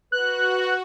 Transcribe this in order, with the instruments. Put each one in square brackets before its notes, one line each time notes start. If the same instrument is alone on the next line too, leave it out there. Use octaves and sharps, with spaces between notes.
[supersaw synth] F#4 [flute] B4 [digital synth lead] F#6